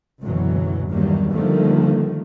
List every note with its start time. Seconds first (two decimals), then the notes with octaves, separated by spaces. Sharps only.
0.21 F#1 D2 B2 E3 F#3
0.90 E2 G2 D#3 F#3 G3 A#3
1.32 D3 D#3 F3 G3 A3 A#3